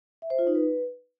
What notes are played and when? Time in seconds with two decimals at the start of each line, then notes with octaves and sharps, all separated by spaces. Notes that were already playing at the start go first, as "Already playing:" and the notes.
0.22 E5
0.30 C5
0.39 F4
0.47 D#4
0.55 B4